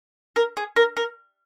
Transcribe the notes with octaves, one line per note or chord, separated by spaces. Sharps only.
A#4
G#4
A#4
A#4